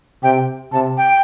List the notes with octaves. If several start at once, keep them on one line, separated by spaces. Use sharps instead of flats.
C3 G5
C3 A5
G5